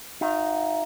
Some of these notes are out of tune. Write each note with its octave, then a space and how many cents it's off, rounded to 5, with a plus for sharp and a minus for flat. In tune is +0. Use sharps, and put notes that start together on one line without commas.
D#4 +0 F#4 -40 E5 +35